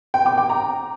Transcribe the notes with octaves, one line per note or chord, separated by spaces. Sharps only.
G5
D6
G5
A#5